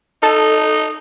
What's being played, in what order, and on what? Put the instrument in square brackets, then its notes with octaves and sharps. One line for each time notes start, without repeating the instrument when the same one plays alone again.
[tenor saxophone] D#4 [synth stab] A4